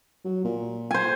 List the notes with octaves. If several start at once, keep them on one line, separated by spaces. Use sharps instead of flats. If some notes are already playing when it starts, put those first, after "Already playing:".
F#3
A#2
C5 G#5